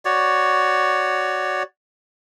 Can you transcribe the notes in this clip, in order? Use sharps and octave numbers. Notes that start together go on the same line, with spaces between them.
F#4 C#5 D5